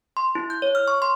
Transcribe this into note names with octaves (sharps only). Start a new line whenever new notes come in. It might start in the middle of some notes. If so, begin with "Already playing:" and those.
C6
E4
G6
C#5
F6
C#6
C6